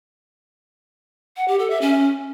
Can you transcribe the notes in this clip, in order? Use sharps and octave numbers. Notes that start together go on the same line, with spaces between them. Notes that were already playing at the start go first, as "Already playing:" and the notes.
F#5
G4
A4
E5
C#4